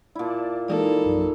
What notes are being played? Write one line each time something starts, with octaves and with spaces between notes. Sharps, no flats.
A#2 E4 D5 A5
E3 G#3 A#3 D#4 A4 D5
A#1 F#2